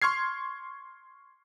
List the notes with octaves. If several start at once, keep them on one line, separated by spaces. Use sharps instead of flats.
C6 C#6 F6 G#6 C7